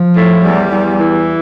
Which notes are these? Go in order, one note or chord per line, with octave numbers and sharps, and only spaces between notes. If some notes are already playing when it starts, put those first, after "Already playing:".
Already playing: F3
A2
E2 G3
E2
E3